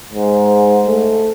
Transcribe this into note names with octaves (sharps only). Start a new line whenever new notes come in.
G#2
A3